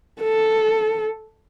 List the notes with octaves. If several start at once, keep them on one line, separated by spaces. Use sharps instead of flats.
A4